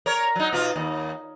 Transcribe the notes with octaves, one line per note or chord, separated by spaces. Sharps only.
A#4 C#5
F#3 D#4
B2 F4
D#2